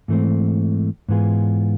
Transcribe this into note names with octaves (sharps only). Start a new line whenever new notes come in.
G#2 E3 A3 C4
G#2 E3 B3 F4 G#4